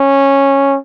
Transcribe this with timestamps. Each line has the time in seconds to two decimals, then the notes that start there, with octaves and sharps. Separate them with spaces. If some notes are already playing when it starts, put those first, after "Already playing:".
Already playing: C#4